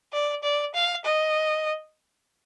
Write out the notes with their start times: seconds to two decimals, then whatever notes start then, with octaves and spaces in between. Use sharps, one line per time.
0.13 D5
0.43 D5
0.74 F5
1.04 D#5